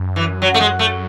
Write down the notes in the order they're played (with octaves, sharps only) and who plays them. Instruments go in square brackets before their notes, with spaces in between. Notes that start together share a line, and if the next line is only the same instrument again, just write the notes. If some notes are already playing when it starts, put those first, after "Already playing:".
Already playing: [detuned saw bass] F#2
[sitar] E3
F#3
A3
G#3
A3